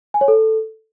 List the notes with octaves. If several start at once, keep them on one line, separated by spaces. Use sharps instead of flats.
G#5
C#5
A4